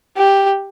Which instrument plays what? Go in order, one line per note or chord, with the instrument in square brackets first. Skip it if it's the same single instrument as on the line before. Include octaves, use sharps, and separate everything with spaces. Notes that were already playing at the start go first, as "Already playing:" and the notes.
[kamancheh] G4